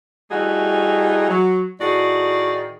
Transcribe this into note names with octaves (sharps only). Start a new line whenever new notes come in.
E3 G3 A3 D#4 F#4 G#4
F#3
A2 D#3 F#4 G#4 D5